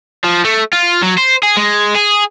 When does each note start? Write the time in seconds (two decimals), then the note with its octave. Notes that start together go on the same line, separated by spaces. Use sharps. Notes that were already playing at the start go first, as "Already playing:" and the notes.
0.24 F3
0.44 A3
0.73 F4
1.02 F#3
1.18 C5
1.43 G#4
1.57 G#3
1.95 G#4